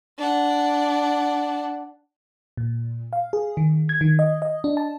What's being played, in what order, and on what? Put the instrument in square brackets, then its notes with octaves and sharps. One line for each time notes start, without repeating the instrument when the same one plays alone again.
[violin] D4 F#5
[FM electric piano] A#2
F5
G#4
D#3
G#6
D#3
D#5
D#5
D4
A5